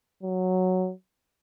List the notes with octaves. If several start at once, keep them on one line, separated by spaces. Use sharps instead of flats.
F#3